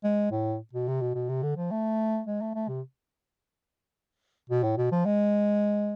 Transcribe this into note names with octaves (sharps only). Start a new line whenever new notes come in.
G#3
A2
B2
C3
B2
B2
C3
D3
F3
A3
G#3
A3
A3
C3
B2
A2
B2
F3
G#3